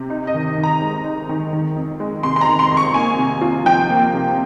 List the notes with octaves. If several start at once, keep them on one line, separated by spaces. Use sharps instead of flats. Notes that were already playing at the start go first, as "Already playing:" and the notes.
Already playing: C3
D#4
D#5
D#3
D#3
A#5
G#3
D#4
D#3
D#3
F2
G#3
C3 C6
C6
A#5
D#3
C6
F2
C#6
A#3 G#5
C3
F4
F3 G5
A#3
C3